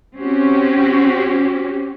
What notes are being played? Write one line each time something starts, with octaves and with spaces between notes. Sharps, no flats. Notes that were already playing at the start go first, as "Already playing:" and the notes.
C4 C#4 F#4 G4